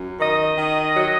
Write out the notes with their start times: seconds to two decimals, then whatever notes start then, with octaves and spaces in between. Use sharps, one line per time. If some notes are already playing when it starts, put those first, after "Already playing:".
Already playing: F#2
0.20 D#3 D#5
0.57 D#3
0.95 F#3